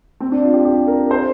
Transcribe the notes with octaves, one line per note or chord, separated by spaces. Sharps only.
C4
D4
F4
G4
G4
A#4
C5